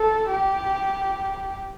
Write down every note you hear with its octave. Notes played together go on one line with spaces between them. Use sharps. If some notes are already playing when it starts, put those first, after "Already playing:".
Already playing: A4
G4